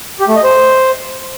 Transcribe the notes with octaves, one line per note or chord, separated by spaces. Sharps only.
G4
A3
D#5
C5